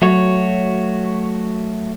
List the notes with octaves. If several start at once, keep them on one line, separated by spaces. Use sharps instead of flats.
F#3 A3 F#4 C#5